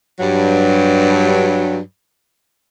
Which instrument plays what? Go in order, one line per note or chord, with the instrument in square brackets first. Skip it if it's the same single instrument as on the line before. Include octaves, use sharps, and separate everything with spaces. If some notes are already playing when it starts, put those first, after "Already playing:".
[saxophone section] G2 F#3